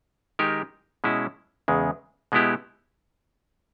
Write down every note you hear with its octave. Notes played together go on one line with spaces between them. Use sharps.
D#3 G#3 D#4 G4 A#4
B2 G#3 C#4 E4
E2 C#3 G#3
B2 G#3 B3 E4 G4